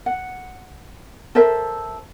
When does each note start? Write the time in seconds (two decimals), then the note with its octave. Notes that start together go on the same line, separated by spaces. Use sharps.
0.06 F#5
1.35 A4 A#4 C5 E5